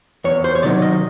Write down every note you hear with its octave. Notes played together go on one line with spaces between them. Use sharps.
E2 C#5
C5
C#5
C3 D#3 F#3 D5
D#5